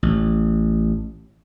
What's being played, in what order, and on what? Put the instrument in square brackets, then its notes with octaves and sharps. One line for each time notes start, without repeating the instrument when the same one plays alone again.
[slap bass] A1